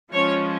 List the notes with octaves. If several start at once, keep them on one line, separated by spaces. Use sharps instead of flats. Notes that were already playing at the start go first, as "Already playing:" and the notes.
F3 G#3 C#4 C#5